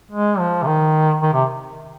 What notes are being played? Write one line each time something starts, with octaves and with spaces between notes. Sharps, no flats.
G#3
F3
C3
D#3
D#3
C3